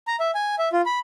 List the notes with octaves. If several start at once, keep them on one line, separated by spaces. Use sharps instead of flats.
A#5
E5
G#5
E5
F4
B5